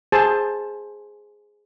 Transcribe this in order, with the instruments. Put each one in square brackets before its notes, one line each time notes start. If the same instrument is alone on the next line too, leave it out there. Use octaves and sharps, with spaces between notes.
[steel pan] G#4 C5 A5